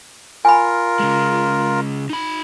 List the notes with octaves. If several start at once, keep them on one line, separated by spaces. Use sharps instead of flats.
F4 A#4 G#5 B5
C#3 G#3
D#4 B5